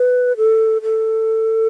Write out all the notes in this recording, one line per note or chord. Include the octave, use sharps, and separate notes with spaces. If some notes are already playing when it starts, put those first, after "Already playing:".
Already playing: B4
A4
A4